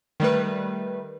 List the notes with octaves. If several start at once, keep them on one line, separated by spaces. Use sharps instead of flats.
D#3 G3 A3 B4